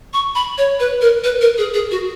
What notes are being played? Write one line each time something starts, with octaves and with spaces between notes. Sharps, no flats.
C#6
B5
C#5
B4
A#4
B4
A#4
G#4
G#4
F#4